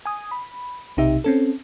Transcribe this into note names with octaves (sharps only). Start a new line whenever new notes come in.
G#5 D#6
B5
B1 C3 D#4 G4 E5
C4 C#4 A4